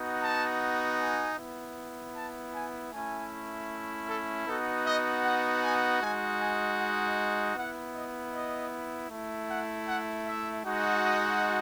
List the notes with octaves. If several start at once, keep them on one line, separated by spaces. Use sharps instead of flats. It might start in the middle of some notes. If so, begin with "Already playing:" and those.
Already playing: B3 D#4 F#4
A5
G#5
B3 E4
A5
G#5
A3 C#4 E4 G#5
A4
B3 D#4 F#4 A4
D#5
F#5
G#5
G#3 D#4 F#4 G#5
G#5
F#5
B3 E4 F#5
D#5
D#5
A3 E4
F#5
F#5
E5
G#3 D#4 F#4
D#5